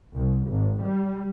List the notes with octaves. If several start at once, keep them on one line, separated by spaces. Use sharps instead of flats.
C2
G#1
G3